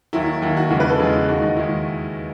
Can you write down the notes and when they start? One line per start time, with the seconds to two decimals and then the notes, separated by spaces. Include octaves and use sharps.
0.13 D#2 D#3 F#3 E4
0.42 D#2 D#3 F#3 E4
0.57 F#4
0.70 E2 C#3 E3 G#3 F#4
0.80 B4
0.89 A4
1.00 E2 C#3 E3 G#3 G#4
1.28 D#2 D#3 G#3 F#4
1.42 D#4
1.56 D#2 D#3 G#3 E4